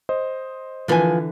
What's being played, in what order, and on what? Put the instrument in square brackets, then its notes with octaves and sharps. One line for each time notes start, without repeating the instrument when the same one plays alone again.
[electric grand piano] C5 D#5
[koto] D3 E3 [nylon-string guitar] F3 B4 G#5